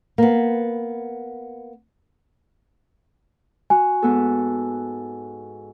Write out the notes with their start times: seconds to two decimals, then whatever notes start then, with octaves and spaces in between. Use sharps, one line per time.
0.18 A#3 B3
3.70 F#4 G#5
4.02 G#2 B3 A4